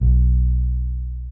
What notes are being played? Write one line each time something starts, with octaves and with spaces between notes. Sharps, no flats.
B1